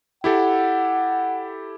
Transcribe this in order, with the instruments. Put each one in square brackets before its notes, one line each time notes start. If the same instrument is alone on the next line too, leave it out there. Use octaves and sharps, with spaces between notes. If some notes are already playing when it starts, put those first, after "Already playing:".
[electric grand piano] E4 G4 A4 [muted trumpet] F#5